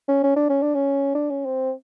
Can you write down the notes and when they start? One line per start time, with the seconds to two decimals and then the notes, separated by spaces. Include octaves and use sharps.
0.08 C#4
0.23 C#4
0.36 D4
0.49 C#4
0.62 D4
0.75 C#4
1.15 D4
1.30 C#4
1.46 C4